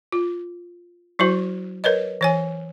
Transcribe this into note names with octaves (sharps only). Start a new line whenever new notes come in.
F4
F#3 E4 F#4 C5
A#4 B4 C#5 D#5
E3 C#5 G#5